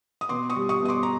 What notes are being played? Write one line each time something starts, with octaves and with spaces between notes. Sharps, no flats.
D#6
B2 C6 D6
C#6 D#6
G3
C#6 D#6
B2 D#6
C6 D6
A#5